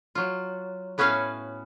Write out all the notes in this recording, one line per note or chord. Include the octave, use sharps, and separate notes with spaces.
F#3 F4
A2 B3 C#4 F#4 B4 F5